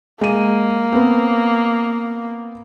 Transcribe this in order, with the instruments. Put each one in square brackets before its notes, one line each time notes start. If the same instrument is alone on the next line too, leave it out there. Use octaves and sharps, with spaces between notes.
[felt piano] G#3 D#7 [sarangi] A#3
[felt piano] B3 C4